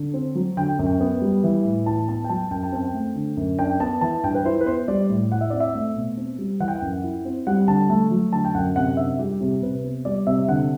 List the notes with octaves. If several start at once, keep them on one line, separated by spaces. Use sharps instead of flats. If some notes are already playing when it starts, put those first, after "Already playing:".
Already playing: D3
C4
F#3
D3 G5
F#2
G5
B3
G3
E3
A2
E4 A5
B3 A5
G5
F#3 A5
F#2 G5
A5
C4 G5
A3
D3
F#2
D4 G5
B3 A5
E3 A5
G2 G5
B4
E4 C5
B4
B3 C5
G3 D5
A2
E4 F#5
E5
C4 D5
E5
A3
B2
C4
G3
E3 F#5
G5
F#5
F#2
E4
C4
G3 F#5
D3 A5
A3
F#3
D3 A5
G5
F#2 F#5
C3 F#5
D4 E5
G3 G4
C3 G4
C3 B4
B3
G3 D5
C3 E5
D3 F#5